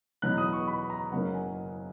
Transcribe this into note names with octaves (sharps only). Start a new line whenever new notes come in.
E2 B2 F#3 B3 F#6
D#6
C#6
B5
A#5
F#1 F#2 C#3 F#3 A#3 F#5
G#5